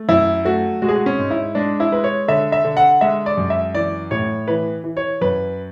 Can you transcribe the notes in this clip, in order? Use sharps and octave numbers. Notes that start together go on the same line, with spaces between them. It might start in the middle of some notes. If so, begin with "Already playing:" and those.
Already playing: A3
F#2 E4
A3 F#4
G#3 F#4
G#4
F#4
C#4
G#2
E4
G#3 D4
E4
G#3 B4
C#5
D3 E5
E5
D3
F#5
G#3 E5
D5
F#2
E5
E3 D5
A2 C#5
E3 B4
E3
C#5
F#2 B4